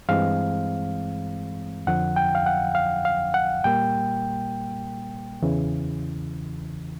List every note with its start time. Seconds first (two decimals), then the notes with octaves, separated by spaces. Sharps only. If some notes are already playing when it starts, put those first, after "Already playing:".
0.09 G2 E3 G#3 C4 F5
1.87 F2 D3 F3 F#5
2.16 G5
2.35 F5
2.46 F#5
2.75 F5
3.05 F5
3.34 F#5
3.64 A#2 G3 A#3 G5
5.42 E2 C#3 E3